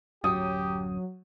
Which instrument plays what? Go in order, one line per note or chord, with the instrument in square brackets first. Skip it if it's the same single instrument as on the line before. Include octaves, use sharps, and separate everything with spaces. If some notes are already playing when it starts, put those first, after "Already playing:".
[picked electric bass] D1 F#2 [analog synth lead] F#3 [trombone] G4 [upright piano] D#6